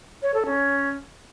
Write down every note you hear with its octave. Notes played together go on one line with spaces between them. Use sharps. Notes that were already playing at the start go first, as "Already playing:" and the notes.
C#5
A4
C#4